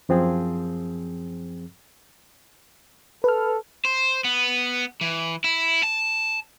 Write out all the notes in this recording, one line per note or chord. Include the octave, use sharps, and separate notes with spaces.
F#2 F3 C4 G#4
A4 B4 F6
C5
B3
E3
E4
A5